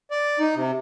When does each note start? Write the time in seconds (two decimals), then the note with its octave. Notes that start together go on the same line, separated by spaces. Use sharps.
0.11 D5
0.39 D#4
0.56 C3